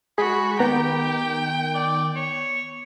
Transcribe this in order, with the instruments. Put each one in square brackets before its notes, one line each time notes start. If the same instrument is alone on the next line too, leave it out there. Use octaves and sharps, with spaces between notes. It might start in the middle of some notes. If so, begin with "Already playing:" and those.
[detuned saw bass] G#3 [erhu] F#4 [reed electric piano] G#4 [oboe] B5
[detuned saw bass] D#3 [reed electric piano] B3 A#5 [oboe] G4 [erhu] G5
[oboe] D5
C#5